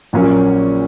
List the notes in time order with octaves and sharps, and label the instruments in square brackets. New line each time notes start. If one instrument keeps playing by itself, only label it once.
[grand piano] A#1 A#2 F#3 A#3 C#4